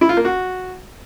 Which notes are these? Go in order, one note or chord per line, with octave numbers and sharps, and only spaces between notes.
E4
F4
A#3
F#4